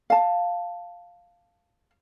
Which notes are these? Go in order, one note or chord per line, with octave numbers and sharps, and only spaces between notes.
F5 A5